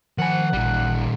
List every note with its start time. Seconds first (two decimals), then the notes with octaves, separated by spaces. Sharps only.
0.18 D#3 F3 F#5 G#5
0.53 A1 A#2 G3